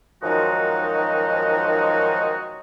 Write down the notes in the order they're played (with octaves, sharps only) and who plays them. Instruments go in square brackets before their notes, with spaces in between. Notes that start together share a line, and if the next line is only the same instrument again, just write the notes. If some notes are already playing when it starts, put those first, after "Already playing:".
[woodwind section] F#2 D#3 F3 G#3 D#4 F#4